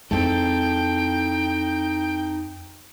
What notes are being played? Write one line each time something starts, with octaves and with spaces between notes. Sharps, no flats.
F2 G#3 C4 D#4 E4 A4 G5